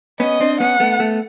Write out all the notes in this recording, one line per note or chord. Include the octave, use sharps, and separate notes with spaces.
B3 C#4 D#5
C4 D4
B3 C#4 F#5
A3 B3
A3 B3